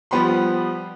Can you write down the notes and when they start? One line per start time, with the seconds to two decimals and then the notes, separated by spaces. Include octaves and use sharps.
0.11 F3 G3 B3 G4 B5 C6